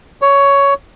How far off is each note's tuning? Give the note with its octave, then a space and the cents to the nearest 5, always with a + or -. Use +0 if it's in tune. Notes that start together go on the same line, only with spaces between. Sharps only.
C#5 +10